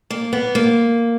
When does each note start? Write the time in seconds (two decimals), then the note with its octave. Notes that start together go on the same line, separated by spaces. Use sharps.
0.10 A#3
0.33 B3
0.55 A#3